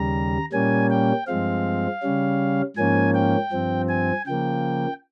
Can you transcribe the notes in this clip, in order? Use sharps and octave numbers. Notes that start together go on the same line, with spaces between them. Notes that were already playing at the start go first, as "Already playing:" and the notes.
Already playing: D#2 C#3 G3 A#5
A#2 G3 A#3 C#4 G#5
G5
G2 F3 G#3 C4 F5
C#3 G3 C#4
G#2 F3 A#3 C#4 G#5
G5
G2 F3 C4
G#5
C#3 F3 A#3 G5